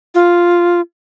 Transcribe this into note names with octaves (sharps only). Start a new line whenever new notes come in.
F4